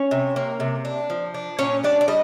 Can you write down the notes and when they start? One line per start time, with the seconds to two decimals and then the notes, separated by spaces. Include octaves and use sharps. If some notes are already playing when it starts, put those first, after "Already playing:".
Already playing: C#4 C#5
0.11 C3
0.36 A#3
0.60 C3
0.85 D4
1.10 F3
1.34 D4
1.59 A#2 C#4 C#5
1.83 G3 D4 D5
2.01 D5
2.08 G3 D#5